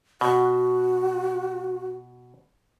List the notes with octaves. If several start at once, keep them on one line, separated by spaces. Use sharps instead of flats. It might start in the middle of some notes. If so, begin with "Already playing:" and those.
B2 F#4